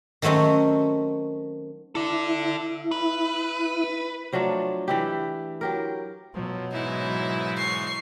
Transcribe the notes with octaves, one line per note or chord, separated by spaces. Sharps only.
D#3 F#3 A3 C4 C#4
E4 A4 D5
B4
F3 F#3 A3 D4
E3 E4 G4
F#3 G4 A#4
B2 F3 F#3
G#2 E3 D#4 E4
C#6 C7